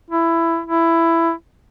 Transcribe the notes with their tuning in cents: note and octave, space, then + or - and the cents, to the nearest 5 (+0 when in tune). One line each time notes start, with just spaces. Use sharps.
E4 +15
E4 +15